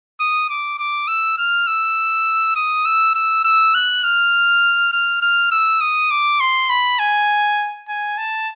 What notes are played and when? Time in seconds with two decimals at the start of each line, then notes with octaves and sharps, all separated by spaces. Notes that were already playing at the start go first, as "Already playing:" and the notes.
0.20 D#6
0.49 D6
0.79 D6
1.07 E6
1.38 F6
1.67 E6
2.55 D#6
2.85 E6
3.15 E6
3.44 E6
3.75 F#6
4.04 F6
4.92 F6
5.22 F6
5.51 E6
5.81 D#6
6.11 D6
6.40 C6
6.70 B5
6.99 G#5
7.88 G#5
8.17 A5